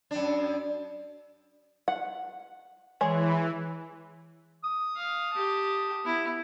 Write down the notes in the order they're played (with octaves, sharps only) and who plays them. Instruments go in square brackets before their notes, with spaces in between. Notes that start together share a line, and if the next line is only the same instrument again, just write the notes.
[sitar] F#2 D4
[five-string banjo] F#5
[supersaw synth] E3 [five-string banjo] G#3 G#4 C#5
[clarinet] D#6
[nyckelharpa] F5
G4 A5
B3 E4